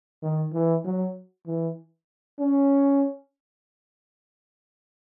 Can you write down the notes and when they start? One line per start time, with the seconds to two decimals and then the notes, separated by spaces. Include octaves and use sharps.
0.22 D#3
0.53 E3
0.84 F#3
1.47 E3
2.39 C#4